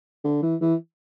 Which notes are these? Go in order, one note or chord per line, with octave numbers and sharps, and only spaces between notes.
D3
E3
E3